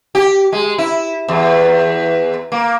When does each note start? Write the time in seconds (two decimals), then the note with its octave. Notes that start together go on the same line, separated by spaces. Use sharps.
0.15 G4
0.53 G#3
0.78 E4
1.28 E2
2.52 A#3